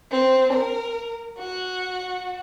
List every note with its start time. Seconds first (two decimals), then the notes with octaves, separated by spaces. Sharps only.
0.11 C4
0.53 A#4
1.38 F#4